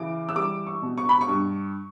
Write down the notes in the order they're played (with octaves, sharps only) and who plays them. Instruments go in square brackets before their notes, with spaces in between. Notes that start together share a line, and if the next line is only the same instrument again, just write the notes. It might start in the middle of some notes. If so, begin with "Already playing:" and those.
Already playing: [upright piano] C#3 E3 D6
E6
G3 D6
C#6
B2
C#6
B5
C#6
G2